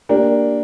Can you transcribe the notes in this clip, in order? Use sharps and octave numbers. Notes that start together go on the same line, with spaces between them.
A#3 D4 G4 A#4